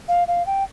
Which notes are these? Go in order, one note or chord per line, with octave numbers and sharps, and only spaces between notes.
F5
F5
G5